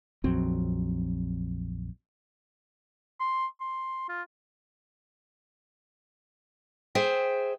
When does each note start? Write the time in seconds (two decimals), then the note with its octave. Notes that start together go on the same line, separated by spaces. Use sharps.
0.24 A#1 F2 F#3 C4
3.20 C6
3.60 C6
4.09 F4
6.95 G#4 C5 E5 G5